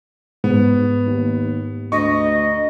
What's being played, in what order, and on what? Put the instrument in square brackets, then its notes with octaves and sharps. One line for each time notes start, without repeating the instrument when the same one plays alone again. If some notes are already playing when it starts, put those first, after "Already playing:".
[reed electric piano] G#2 [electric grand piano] B3
[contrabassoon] D#2
[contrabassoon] D2 [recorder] D#5 [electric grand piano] C#6